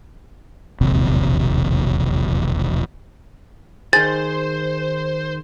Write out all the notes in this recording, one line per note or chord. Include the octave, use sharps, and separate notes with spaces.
E1 A#1 D#2 C3
D#3 G#4 C5 A6